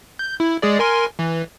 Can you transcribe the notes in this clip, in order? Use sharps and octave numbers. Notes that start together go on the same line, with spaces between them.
G6
E4
G#3 G#4 D5
A#4 G#5 C6
E3